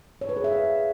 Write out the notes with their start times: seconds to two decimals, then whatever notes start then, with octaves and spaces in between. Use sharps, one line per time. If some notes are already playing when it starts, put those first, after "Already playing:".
0.21 C#5
0.29 B4
0.37 G#4
0.44 E5
0.52 F5